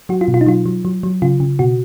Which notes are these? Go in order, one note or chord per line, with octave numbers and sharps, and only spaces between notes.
F#3 F#4
F4
B2
F4
D#4
F#3 F4
F#3
F#3
F#3
C#3 F4
C#3
B2 F#4